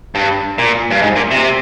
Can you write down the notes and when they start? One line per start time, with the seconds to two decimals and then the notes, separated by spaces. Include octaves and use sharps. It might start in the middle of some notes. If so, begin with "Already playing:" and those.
0.15 G2
0.58 A#2
0.90 G2
1.02 G#2
1.16 A#2
1.31 C3